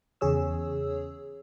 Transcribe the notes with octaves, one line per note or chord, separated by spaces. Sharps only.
E2 C#3 G#4 C#5 E6